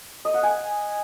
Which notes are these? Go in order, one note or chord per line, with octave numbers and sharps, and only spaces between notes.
D#5
F#5
G#5